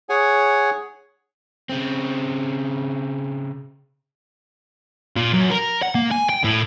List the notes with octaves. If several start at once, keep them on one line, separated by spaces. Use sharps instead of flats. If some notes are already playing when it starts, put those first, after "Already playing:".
G#4 C#5 F#5 G#5
C#3 C4
A#2
F#2
A#4
F#5
A#3
G#5
G5
A2